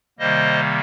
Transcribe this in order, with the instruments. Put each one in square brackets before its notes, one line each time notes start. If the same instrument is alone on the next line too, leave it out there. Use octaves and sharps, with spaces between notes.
[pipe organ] C3 D#3 G3 A#3 C5 D#5